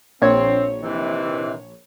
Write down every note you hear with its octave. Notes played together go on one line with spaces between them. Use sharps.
A#1 C4 C#5
C3 D#3 E3